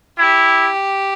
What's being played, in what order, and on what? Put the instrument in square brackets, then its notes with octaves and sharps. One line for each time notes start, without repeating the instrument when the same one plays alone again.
[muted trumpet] E4 [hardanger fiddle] G4